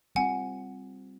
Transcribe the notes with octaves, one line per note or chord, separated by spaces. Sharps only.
G3 C4 F4 F#5 G#5